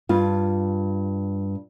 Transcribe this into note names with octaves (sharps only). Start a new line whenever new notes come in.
G2 F4